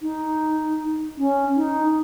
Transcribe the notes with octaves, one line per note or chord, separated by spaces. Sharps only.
D#4
C#4
D#4